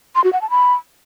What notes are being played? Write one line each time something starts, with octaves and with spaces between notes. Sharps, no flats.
C6
F#4
F#5
A5
B5